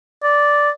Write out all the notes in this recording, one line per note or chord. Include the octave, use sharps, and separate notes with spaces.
D5